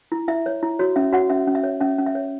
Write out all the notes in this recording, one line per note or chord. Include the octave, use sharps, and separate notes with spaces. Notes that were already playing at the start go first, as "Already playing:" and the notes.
E4
E4 E5
C#5
E4
F#4 C#5
C#4 E5
F#4 C#5 F#5
C#4 E5
C#4
E5
C#5
C#4 E5
C#4
E5
C#5